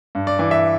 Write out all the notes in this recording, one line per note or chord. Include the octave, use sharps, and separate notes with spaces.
G2
D5
E3 D5
E5